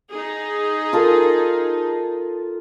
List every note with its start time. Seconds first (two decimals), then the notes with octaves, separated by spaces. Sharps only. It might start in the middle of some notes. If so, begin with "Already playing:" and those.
0.12 D#4 G#4
0.93 F4 A4 A#4